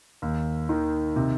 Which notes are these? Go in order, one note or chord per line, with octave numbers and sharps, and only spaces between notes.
D#2
D#3
C3